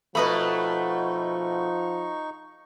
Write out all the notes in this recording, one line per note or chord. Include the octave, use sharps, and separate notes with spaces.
B2 F3 A3 D#4 B4 D#5 B5 C#6